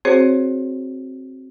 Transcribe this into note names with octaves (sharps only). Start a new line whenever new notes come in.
C4 F#4 G#4 C5 C#5